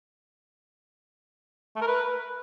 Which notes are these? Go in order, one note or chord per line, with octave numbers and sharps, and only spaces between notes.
A3
A#4
B4